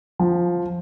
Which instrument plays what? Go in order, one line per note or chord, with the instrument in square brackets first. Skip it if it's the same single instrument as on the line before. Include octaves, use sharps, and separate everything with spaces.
[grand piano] F3